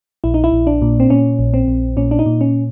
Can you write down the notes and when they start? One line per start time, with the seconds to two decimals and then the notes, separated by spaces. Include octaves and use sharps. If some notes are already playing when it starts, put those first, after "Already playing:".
0.24 A#1 E4
0.34 D#4
0.44 E4
0.52 A#1
0.67 D4
0.82 A#2
1.00 C4
1.10 A#2 C#4
1.39 A#1
1.54 C4
1.68 A#1
1.97 A#2 C#4
2.11 D4
2.19 D#4
2.26 A#2
2.41 C#4